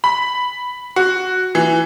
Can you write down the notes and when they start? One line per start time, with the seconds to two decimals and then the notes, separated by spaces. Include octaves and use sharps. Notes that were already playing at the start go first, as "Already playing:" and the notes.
0.04 B5
0.96 F#4
1.55 E3